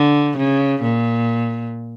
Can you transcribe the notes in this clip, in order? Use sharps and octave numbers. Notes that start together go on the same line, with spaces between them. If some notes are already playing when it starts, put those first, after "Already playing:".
Already playing: D3
C#3
A#2